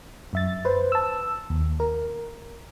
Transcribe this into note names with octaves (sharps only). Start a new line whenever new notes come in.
F#2 E5 A6
B4 C5
A5 E6
D#2
A#4